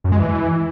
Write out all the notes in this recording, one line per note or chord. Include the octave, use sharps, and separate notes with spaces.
F#2
G#3
E3